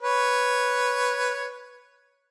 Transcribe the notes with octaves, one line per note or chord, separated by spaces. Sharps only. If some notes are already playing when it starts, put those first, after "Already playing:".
B4 C#5